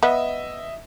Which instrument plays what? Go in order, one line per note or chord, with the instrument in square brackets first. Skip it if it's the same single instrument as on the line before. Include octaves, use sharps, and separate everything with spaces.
[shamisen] B3 [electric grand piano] D#5 E5